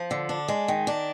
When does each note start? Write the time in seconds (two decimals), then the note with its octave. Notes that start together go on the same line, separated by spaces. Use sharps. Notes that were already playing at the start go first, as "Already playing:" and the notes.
Already playing: F3
0.11 D3
0.29 D4
0.48 G#3
0.68 D#3
0.87 D4